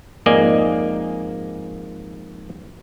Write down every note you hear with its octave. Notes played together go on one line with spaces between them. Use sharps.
F2 G#2 A#3 D5 D#5 G#5